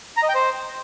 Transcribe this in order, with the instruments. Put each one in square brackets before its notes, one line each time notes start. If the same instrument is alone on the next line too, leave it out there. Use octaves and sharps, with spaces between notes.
[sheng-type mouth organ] A#5
D#5
G5
C5